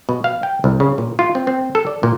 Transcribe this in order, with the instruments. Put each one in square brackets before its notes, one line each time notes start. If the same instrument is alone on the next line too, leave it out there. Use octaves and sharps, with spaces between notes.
[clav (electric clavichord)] B2
F5
G5
C2
C#3
A#2
F4
C4
C4
A4
D5
A#2